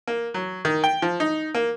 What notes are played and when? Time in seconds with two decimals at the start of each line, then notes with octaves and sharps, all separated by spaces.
0.08 A#3
0.34 F#3
0.65 D#3
0.84 G5
1.02 F3
1.20 D#4
1.55 A#3